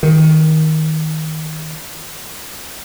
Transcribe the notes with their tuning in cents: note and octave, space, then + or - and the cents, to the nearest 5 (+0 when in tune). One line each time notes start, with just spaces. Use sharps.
D#3 +15